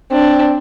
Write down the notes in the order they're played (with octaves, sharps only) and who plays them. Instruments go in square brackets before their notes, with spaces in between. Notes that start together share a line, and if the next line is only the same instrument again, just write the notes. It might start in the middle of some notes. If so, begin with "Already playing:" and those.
[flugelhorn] C4 [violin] D4